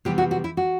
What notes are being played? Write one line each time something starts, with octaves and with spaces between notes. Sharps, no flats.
C3 E3 G3 B3 G4
F#4
F#4
E4
F#4